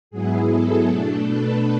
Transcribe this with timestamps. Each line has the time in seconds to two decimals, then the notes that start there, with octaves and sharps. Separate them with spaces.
0.11 G#2 F#3 B3 E4 G#4
0.50 A4
0.89 B2 A3 D4
1.27 B4